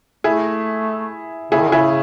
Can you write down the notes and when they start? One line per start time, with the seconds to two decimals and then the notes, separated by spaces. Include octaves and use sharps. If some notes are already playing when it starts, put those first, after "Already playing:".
0.24 A3 E4 G#4
1.51 C#3 E4 G#4
1.61 D#3
1.70 C#3 E4 G#4